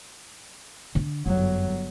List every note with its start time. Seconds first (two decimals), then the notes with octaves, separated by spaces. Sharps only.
0.95 D3
1.26 G1 F#2 F#3